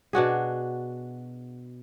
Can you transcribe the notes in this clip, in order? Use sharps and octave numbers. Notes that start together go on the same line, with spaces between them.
B2 D4 F#4 G#4